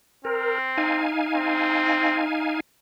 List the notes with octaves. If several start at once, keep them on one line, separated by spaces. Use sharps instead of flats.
C4 A#4
D#4 F5 G#5
C4